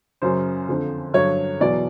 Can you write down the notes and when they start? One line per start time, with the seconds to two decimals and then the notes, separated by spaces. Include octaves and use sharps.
0.22 F#2 C#3 F#3 C5
0.69 F2 D3 F3
1.14 G2 D3 F#3 C#5
1.60 E2 B2 F#3 D5